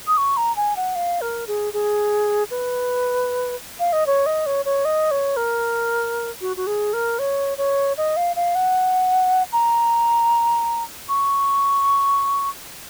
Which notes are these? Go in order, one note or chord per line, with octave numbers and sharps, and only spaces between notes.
D#6
C#6
A#5
G#5
F#5
F5
A#4
G#4
G#4
B4
F5
D#5
C#5
D#5
C#5
C#5
D#5
C#5
A#4
F#4
F#4
G#4
A#4
C#5
C#5
D#5
F5
F5
F#5
A#5
C#6